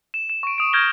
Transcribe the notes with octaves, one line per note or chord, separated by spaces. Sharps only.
E7
E7
C#6 D7
D#6 D7
F6 G6 G#6 A#6 D7 G7